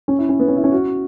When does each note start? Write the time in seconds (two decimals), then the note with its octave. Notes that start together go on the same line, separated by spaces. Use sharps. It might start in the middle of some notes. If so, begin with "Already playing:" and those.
0.08 C#4
0.19 E4
0.29 C#4
0.40 B3
0.48 C#4
0.56 E4
0.64 C#4
0.72 F#4